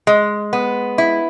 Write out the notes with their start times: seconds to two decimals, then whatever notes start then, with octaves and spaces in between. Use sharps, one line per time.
0.07 G#3
0.53 B3
0.98 E4